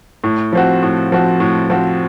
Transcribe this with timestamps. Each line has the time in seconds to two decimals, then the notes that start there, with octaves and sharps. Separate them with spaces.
0.24 A2
0.53 F3 C4 F#4
0.83 A2
1.12 F3 C4 F#4
1.40 A2
1.70 F3 C4 F#4